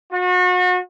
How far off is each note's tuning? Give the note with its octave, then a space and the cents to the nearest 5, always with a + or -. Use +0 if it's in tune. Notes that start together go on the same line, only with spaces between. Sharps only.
F#4 -35